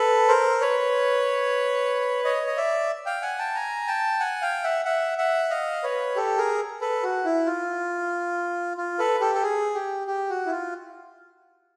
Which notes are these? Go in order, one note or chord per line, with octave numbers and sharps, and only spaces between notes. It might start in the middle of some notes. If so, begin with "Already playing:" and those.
Already playing: A4 B4
A#4 C5
B4 C#5
C#5 D#5
D#5
D5 E5
F5 G5
F#5 G#5
G5 A5
G#5 A#5
G5 A5
F#5 G#5
F5 G5
E5 F#5
E5 F#5
E5 F#5
D#5 F5
B4 C#5
G4 A4
G#4 A#4
A4 B4
F#4
E4
F4
F4
A4 B4
G4 A4
A4
G#4
G4
G4
F#4
E4
F4